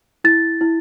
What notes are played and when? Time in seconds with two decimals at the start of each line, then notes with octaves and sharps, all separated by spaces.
0.24 E4 A6
0.61 E4